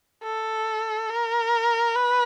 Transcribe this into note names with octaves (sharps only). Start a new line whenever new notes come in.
A4
A#4
B4